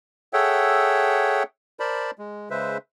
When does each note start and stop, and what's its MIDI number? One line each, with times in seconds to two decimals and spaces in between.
0.33 1.43 68
0.33 1.43 69
0.33 1.43 73
0.33 1.43 76
0.33 1.43 78
0.33 1.43 79
1.80 2.11 70
1.80 2.11 72
1.80 2.11 74
1.80 2.11 81
1.80 2.11 83
2.19 2.50 56
2.50 2.78 49
2.50 2.78 56
2.50 2.78 71
2.50 2.78 72
2.50 2.78 76